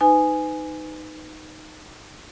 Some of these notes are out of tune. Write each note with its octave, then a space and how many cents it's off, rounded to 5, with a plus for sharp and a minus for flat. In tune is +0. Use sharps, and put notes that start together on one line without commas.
D#4 +0 B4 +35 G#5 +0